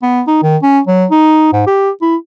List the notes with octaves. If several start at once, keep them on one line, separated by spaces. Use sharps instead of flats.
B3
D#4
D#3
C#4
F#3
D#4
G#2
G4
E4